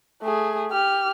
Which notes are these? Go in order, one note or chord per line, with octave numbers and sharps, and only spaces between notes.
A3 G#4
G4 F6